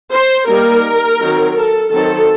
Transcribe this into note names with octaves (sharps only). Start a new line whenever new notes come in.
C5
G3 A#3 D#4 A#4
D#3 F#3 C4 D#4
A4
D#3 F#3 C4 D#4 A4